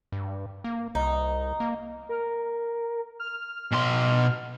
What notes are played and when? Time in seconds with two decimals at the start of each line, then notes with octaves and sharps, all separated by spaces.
0.12 G2
0.64 A#3
0.95 C2 D#4
1.60 A#3
2.09 A#4
3.20 F6
3.71 B2 C6